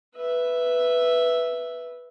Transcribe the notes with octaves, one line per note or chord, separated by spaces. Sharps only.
B4 E5